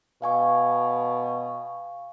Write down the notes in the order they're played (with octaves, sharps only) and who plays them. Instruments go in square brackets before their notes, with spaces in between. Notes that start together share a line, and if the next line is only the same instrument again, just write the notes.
[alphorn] B2 [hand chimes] F5 G#5 C#6